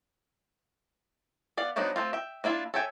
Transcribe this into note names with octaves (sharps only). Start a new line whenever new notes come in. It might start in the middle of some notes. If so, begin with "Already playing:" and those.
B3 D5 F5
F3 F#3 B3 D4 D#4
A3 C4 F4
E5 G5
A#3 D4 E4 F4
A4 C#5 E5 G5 G#5